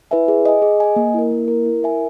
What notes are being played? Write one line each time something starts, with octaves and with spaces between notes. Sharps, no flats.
E4 B4 E5 G#5
G#4
D#5 G#5
G#4
D#5 G#5
A#3
E4 A#4
A#3
E4 A#4
E4
A#4 E5 G#5